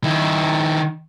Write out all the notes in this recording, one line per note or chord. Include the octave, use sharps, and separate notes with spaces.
D#3 E4